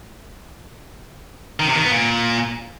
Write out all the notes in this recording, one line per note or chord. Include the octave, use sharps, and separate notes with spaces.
D#3
C3
D#3
B3
A#2